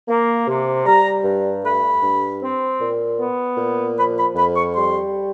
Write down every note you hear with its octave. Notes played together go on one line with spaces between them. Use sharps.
A#3
C3
G3 A#5
G2
A3 B5
G2
C4
A#2
B3
A#2
F3 B5
B5
F2 B5
C#6
G3 C6